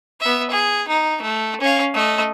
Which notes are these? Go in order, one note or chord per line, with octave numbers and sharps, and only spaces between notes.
B3 E5
G#4
D#4
A3
C#4 F5
A3 D#5